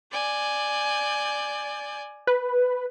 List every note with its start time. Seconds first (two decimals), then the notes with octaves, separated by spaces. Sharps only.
0.12 D5 G#5 G6
2.27 B4